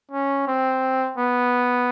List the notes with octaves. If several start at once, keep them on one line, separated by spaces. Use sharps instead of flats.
C#4
C4
B3